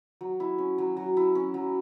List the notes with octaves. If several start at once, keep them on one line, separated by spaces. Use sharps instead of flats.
F#3
E4
C#4
F#3
F#3
E4
C#4
F#3